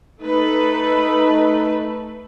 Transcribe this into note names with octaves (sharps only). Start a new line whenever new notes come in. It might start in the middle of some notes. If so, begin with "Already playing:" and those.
A3 D#4 A4 B4